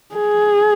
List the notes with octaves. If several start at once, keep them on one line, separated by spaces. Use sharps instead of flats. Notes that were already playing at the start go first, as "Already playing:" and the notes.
G#4